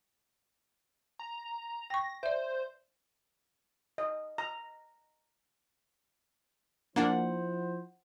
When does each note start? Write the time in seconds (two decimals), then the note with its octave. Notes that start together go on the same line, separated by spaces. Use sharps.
1.19 A#5
1.90 G5 C#6 A#6
2.23 C5 D5 E5
3.98 D#5
4.38 A#5
6.96 F3 A#3 D4 E4 C5 F#5